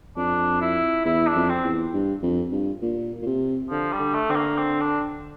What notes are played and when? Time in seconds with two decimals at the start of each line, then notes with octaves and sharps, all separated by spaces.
0.17 F2 D4
0.62 E4
1.05 E2 E4
1.27 D4
1.35 F2
1.49 C4
1.64 E2
1.94 G2
2.23 F2
2.52 G2
2.82 A#2
3.22 A#2
3.26 C3
3.70 D3 F3
3.92 G3
3.99 D3
4.14 A3
4.29 D3 C4
4.36 A#3
4.58 C4
4.81 D4